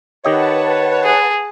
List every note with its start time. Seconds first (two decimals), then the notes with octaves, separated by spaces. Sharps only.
0.25 D#3 G4 B4 C#5 D#5 F#5 A5
1.04 G#4